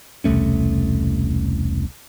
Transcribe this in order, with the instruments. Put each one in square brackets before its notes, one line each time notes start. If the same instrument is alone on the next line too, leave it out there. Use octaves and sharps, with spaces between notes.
[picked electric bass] E1 C2 A3 C#4